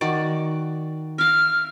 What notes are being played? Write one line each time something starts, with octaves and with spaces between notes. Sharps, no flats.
D#3 F#4 D5
E5 F5 F6